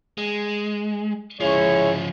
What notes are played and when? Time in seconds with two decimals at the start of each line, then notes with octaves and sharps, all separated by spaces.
0.18 G#3
1.40 F3 G#3 C#4 E4 C#5